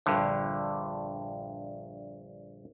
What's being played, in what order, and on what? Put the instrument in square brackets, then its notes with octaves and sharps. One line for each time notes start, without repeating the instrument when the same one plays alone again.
[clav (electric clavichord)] A#1 G2 D3